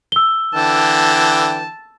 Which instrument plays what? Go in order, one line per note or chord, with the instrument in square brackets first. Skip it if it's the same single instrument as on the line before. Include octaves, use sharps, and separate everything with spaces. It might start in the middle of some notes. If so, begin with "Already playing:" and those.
[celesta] E6 G7
[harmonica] D3 E3 G5 [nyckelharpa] A5